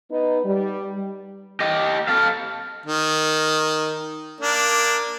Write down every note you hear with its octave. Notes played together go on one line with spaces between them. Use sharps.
B3 D#4
G3
G4 D#5
A4 F5
D#3
A#3 D4